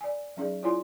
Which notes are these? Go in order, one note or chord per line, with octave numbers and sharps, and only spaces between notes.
D5 G#5
F#3 C#4 D#4 G#4 D5
E4 F4 C#5 D5 G#5 C6